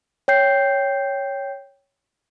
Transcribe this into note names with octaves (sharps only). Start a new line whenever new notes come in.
C#5 G5 G6 C7